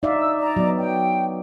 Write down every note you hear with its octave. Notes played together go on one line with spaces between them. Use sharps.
D#4 D5 E5 F5
E6
D5 A#5
F#3 B3
G5